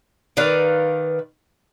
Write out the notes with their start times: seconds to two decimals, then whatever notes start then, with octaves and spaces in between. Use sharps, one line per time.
0.37 D#3 B4 D5 F5